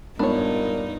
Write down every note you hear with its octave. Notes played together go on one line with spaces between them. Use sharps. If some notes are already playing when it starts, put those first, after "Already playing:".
G2 A#2 G#3 B3 D4 D#4 C#5 B5